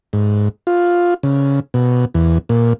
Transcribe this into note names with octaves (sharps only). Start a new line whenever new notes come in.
G#2
F4
C#3
B2
E2
A#2